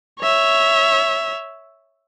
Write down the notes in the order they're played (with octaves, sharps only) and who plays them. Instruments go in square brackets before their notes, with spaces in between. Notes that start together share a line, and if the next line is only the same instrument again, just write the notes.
[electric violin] C#5 E5